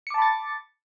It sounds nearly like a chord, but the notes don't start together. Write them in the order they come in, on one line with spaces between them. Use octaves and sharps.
C#7 D6 A5 B5 A6